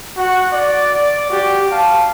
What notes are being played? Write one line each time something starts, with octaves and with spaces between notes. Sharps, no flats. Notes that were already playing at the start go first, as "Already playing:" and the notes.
F#4 F#5
D5
F#4 G4
F5 A5